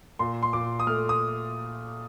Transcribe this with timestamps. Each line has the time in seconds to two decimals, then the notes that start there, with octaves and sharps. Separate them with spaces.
0.19 A#2 C6
0.43 C6
0.53 A#2 D6
0.80 D#6
0.87 A3 F6
1.09 D#6